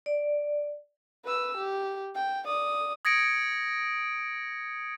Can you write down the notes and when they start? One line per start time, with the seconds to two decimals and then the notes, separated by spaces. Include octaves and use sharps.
0.06 D5
1.25 B4 E6
1.58 G4
2.15 G5
2.46 D5 D#6
3.05 D#6 G#6 A#6 C#7 D7